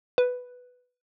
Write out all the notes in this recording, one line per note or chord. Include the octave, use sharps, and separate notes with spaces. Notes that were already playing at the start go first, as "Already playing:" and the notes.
B4